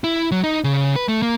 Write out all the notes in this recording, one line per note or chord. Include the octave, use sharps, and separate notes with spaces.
E4
F#3
D#4
C#3
B4
A3
A#3